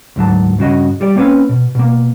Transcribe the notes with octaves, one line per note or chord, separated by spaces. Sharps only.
D2 G#2 F#3 A5
G2 C#3 F#4 D#5
G3 G4 D5
A#3 C4 C#4 B4
B2
B2 A#3